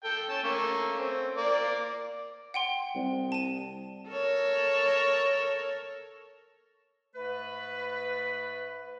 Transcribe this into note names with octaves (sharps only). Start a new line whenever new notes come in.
A4 G5
C#4 A5
A3 A#3 C#4
C4
A#3 D5
F#5 G5 C6
C2
A5 D#7
A4 A#4 C#5
G#2 A3 B4